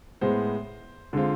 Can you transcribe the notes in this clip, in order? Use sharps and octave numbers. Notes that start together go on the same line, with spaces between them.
A2 G#3 B3 C5
D3 G#3 C4 F4